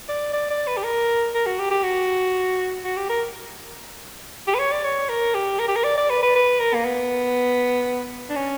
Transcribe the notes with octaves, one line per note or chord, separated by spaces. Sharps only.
D5
D5
D5
B4
G4
A#4
A#4
F#4
G4
G4
F#4
F#4
G4
A#4
G4
B4
C#5
D5
C#5
A#4
G4
A#4
G4
A#4
D5
D5
B4
B4
B4
A#4
A#3
B3
D4
C#4